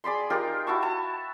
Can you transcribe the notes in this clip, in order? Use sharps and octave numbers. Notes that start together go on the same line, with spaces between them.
G#4 D5 B5 C6
D#4 F4 G4 A#4
E4 F#4 A5 C#6
A5